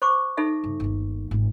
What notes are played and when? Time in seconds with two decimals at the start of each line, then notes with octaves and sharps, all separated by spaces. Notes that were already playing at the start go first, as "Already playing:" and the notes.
0.02 C5 C#6 D6
0.37 D#4 A4 E5
0.64 G2 C#3
0.80 G1 D#2
1.31 G#1 F4